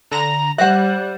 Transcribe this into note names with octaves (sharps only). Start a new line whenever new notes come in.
D3 A#5 A#6
G3 C5 E5 F#5 F#6